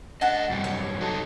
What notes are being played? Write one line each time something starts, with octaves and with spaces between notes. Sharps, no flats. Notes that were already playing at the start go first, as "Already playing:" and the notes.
A3 D4 D#5 F#5 A5
F#2 C3 G3
C#5
F#3 D#4 A4